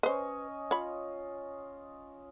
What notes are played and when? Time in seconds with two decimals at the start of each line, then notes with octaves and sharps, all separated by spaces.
0.03 C#4 B4 C5 D#5
0.71 F4 C#5 B5